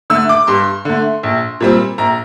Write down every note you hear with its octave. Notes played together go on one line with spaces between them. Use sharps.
D3 A3 E6
D6
G2 C6
D3 A3
A#1
A#2 G3 C4
A#1 A#5